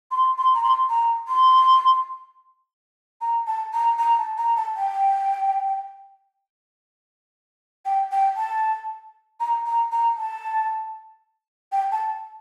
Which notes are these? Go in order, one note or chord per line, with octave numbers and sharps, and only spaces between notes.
C6
C6
A#5
C6
A#5
C6
A#5
A5
A#5
A#5
A5
A#5
A5
G5
G5
G5
A5
A#5
A#5
A#5
A5
G5
A5